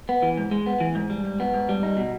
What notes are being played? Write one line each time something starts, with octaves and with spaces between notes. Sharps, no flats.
B3
E3
G#2
G#3
B3
E3
G#2
G3
G#2
B3
G#2
G3
D#4
B2